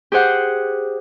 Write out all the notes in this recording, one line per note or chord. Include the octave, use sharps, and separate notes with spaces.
G4 G#4 C5 F#5 G6